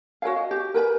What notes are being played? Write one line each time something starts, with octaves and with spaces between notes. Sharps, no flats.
F#4 A#4 C#5 F5
D#5
G4
A#4 B4 G#5 B5